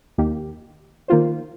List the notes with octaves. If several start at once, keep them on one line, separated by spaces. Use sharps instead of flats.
D#2 D#3 A#3 G4
D#3 A#3 F4 C5